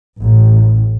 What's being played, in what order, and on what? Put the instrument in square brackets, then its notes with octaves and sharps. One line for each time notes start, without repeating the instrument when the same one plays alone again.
[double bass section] A1